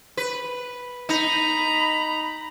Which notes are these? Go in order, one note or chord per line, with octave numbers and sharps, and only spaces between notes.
B4
D#4 A#5 B5